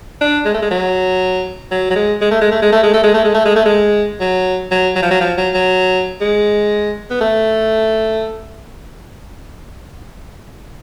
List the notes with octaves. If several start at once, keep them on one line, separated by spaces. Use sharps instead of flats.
D4
G#3
A3
G#3
F#3
F#3
F#3
G#3
G#3
A3
G#3
A3
G#3
A3
G#3
A3
G#3
A3
G#3
A3
G#3
A3
G#3
F#3
F#3
F#3
F3
F#3
F3
F#3
F#3
G#3
B3
A3